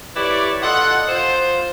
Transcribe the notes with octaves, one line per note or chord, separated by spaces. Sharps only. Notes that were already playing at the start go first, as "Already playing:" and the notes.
E4 G4 B4 C#5 D5
F4 A4 D#5 F#5
F4 C5